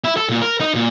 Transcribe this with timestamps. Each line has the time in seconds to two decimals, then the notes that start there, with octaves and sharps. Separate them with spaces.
0.04 E4
0.17 A4
0.29 A#2
0.42 A#4
0.60 D#4
0.75 A#2